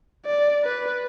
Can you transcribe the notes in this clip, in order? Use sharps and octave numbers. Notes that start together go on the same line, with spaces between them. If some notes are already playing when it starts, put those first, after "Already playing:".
D5
B4